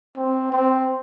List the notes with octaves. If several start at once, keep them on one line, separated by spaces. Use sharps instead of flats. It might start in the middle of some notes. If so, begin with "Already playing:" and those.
C4
C4